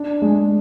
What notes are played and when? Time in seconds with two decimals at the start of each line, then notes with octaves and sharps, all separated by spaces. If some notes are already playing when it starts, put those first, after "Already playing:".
Already playing: D4
0.22 G#3